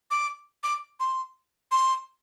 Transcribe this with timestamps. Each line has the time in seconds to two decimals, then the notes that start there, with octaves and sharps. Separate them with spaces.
0.11 D6
0.63 D6
1.00 C6
1.71 C6